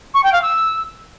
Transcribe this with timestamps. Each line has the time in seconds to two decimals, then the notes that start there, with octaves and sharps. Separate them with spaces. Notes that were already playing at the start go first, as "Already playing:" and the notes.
0.14 C#6
0.23 G5
0.32 F5
0.42 E6